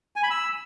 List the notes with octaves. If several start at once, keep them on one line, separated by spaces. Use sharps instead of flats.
G#5
B5
E6